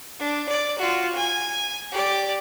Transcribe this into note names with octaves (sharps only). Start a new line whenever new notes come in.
D4
D5
F4 F#4
G#5
G4 D5